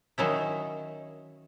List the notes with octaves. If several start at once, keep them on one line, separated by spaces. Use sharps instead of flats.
D#3 F#3 C#4 E4